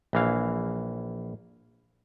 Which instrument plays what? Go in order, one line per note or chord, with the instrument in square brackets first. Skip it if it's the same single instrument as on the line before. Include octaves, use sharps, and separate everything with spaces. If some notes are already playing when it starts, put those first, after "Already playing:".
[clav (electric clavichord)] A#1 E3 F5